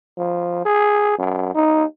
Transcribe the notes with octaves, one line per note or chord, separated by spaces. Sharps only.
F3
G#4
F#2
D#4